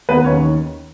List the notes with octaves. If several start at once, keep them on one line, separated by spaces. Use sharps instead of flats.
D#2 B3 B4
D#2 C#4 C#5
D#3